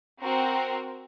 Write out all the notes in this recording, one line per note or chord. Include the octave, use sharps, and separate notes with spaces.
C4 F#4 A#4